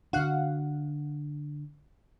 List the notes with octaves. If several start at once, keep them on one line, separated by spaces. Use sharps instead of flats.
D3 D4 F#4 F5 F#5